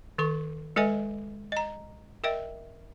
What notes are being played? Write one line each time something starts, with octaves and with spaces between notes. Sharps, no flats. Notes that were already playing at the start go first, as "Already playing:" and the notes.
D#3 A4 C#6
G#3 A4 B4 D#5 E5 G#5
D#5 A#5
A#4 D#5 E5 G5